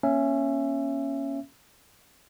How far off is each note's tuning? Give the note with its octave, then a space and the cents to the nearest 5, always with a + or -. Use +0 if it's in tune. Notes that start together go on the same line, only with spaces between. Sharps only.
A#3 +35 C#4 +0 E5 +20